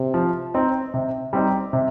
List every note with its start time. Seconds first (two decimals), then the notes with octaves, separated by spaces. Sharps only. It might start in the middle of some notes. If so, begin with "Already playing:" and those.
Already playing: C3
0.14 F3
0.54 C4 D#4
0.94 C3
1.33 G3 C4 D#4
1.73 C3